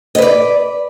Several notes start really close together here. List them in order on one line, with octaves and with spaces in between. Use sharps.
D#5 B4 D5